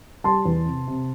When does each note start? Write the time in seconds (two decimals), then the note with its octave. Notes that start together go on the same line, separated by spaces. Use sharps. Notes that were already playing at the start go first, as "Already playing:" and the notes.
0.24 G3 A5 C6
0.45 E2
0.65 C3
0.87 C3